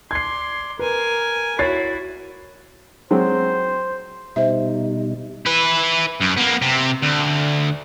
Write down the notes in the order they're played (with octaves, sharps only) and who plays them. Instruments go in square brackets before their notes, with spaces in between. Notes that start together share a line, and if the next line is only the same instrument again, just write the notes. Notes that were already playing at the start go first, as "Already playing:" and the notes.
[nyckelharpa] D5 C6 [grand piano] G#6 C7
[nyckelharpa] A#4 G#5 [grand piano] B4
[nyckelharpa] E4 F#4 [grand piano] C#5 A6 C7
[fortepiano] F#3 G#3 C4 [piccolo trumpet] C5
[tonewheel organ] B2 G3 D#4 [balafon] C5 E5
[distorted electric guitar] E4 B4
F#2
A#3 B3
C3
D2